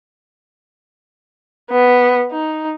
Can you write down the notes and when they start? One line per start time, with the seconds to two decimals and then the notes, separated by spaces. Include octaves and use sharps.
1.71 B3
2.31 D#4